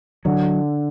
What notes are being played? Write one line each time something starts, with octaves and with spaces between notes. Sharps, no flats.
D3 F#3